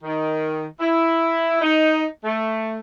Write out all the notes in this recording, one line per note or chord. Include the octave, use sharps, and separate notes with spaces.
D#3
E4
D#4
A3